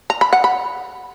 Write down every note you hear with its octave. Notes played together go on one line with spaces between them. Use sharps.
A#5
B5
F#5
B5